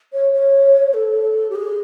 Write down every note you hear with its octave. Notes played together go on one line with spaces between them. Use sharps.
C#5
C#5
A4
G4
G#4